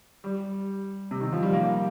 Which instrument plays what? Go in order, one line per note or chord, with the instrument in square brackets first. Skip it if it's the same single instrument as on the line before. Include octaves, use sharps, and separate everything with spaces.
[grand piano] G3
C3
D#3
F3
G3
A#3